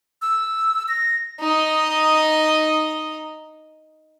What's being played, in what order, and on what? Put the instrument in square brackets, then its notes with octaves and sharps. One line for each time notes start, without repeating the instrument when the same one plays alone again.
[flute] E6
A#6
[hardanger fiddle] D#4 D#5